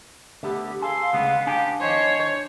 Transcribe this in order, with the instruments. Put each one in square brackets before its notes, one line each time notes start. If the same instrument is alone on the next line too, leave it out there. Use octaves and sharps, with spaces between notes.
[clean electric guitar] D3 A3 B3 [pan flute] G4
[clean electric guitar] G#4 A4 [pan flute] F5 [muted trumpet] C6
[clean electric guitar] D2 C#3 G#3 [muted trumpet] B3
[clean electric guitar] D4 G#5 A5 [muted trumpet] G4
[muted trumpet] C5 [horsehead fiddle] C#5 [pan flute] D#5